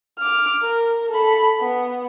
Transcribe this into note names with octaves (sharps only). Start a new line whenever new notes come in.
D6 F6
A#4
A4 B5
B3